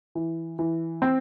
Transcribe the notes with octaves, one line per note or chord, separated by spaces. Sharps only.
E3
E3
C4